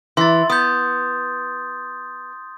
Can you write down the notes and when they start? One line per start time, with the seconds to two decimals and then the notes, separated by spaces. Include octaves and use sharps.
0.17 E3 C6 A6
0.50 B3 D#6 G6